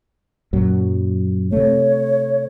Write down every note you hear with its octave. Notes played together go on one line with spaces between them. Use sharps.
F#2 A#2 F#3
C3 A3 C#5